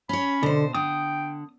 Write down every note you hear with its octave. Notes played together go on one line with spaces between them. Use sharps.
C#4 C#5 B5
B2 D3 C5
D3 G5 D#6